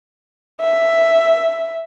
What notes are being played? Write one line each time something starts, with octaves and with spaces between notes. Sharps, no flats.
E5